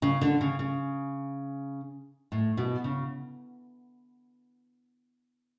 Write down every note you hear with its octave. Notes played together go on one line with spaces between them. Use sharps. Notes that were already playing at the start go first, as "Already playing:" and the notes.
C#3
D3
C#3
C#3
A2
B2
C#3